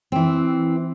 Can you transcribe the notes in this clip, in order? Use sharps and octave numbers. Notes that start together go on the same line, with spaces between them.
E3 C4